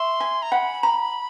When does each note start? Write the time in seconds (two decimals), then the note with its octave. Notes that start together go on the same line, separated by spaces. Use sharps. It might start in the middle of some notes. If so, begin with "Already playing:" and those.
Already playing: E5 C6 C#6
0.20 G#5
0.42 A#5
0.52 F#5 B5
0.83 A#5